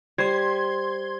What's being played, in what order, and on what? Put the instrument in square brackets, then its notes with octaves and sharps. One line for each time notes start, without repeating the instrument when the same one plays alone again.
[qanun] G3 [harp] C5 [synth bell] C6 G#6